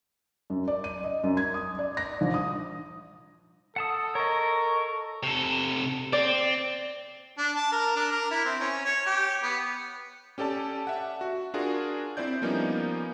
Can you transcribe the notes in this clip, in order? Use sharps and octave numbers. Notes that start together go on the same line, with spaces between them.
F#2
D5
D#7
D#5
F#2
G#6
D#6
D5
A#6
A#1
D#6
A4 F#5 A5 D#6
A#4 C#5 D#5 C#6
C3 A4
C4 D5
D4
A5
A#4
D4
A#4
E4
C4
C#4
C#5
G4
B3
C#4 G4 A4 D5 A5
E5 F#5
F#4
D4 F4 F#4 G#4 A#4
C4 E4 C5 D5 G6
F3 G3 A#3 B3 C#4 D#4